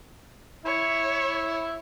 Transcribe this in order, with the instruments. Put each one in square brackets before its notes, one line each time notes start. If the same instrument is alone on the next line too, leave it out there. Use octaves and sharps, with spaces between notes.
[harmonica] E4 E5 [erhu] C#5